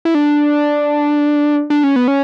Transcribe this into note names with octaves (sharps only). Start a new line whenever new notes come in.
E4
D4
D4
C#4
B3
C#4